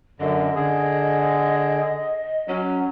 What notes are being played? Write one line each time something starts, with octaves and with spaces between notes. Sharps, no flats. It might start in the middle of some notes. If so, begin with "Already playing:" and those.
F#2 D3 D#5
D3 G#4
F#3 C#4